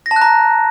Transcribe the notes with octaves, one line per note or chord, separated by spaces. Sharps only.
A#6
A5
F#6
A#5